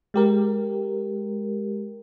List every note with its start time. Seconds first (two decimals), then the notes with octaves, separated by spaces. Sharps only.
0.14 G#3 G4 A#4